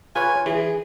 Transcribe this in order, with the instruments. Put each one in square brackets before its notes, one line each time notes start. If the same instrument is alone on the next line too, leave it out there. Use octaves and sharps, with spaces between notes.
[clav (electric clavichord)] F4 B4 C#5 [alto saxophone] G#5
[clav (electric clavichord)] E3 [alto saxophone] G#4